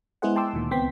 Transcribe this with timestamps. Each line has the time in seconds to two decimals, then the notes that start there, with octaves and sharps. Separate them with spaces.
0.22 G#3 B3 E4 G#4 C5 F#5
0.36 G5 A5 C6 D6 E6
0.53 D2 A#2 D#3
0.71 C#2 B3 C4 G5 C6 B6